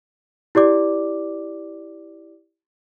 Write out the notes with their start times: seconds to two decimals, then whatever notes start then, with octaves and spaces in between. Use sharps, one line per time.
0.55 E4 G4 D5 D6